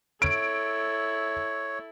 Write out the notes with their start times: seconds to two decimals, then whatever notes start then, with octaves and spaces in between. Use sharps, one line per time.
0.22 E4 A4 C#5 D7